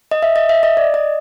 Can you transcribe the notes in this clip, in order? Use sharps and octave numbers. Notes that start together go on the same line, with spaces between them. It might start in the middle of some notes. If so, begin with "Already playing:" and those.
D#5
E5
D#5
E5
D#5
D5
D#5